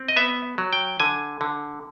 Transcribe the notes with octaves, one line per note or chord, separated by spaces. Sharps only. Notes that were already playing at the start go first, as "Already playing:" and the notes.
Already playing: C4
D#5
B3 E5
F#3
G5
D3 G#5
D3